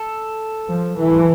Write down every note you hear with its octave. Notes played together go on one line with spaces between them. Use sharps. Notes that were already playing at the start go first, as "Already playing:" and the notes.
Already playing: A4
F3
E3